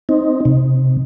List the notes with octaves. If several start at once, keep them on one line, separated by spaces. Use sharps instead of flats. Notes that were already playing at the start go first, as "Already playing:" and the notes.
C4 D#4
C3